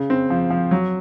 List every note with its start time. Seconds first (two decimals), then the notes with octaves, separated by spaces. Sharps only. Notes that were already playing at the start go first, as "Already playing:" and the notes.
Already playing: C#3
0.10 C4
0.30 F3
0.50 F3
0.71 F#3